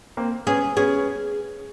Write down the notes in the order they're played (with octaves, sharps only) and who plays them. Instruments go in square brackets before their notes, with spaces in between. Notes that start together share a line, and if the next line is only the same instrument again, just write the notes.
[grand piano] A#3 C4
[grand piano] B3 C#4 [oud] G#4
[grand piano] B3 C#4 [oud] G#4